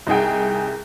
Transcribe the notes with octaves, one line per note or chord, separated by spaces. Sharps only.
C2 D#4 G#4 G5